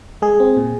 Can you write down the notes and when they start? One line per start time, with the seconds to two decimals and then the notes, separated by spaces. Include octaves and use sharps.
0.22 G#3 G#4
0.40 C4
0.57 A#2